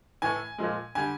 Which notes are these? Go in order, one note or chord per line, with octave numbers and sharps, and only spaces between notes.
A2 E3 A3 G#5
A#2 F3 G#3
D3 G3 G#5